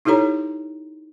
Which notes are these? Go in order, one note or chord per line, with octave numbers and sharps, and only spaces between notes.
D#4 E4 G4 A4 C#5 A#5